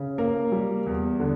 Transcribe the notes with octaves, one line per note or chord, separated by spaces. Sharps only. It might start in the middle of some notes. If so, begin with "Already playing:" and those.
Already playing: C#3
A#3 A#4
G3
E2
D3